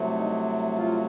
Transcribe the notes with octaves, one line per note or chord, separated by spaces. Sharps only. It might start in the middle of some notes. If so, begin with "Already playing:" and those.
Already playing: C2 C3 F#3 A3
D#4
F4